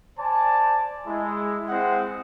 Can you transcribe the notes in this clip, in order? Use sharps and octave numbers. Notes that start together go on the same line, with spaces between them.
C5 D5 G#5 A5
G#3 E4
G#3 C4 E4 C5 D#5 F#5